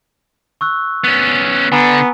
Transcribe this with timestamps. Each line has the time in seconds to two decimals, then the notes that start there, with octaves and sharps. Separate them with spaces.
0.61 C#6 E6 F#6
1.04 B3 C#4 A6
1.72 D3 B3 G#5 A#5